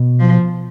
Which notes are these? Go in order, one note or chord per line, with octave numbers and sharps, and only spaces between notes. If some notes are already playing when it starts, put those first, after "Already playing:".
Already playing: B2
F3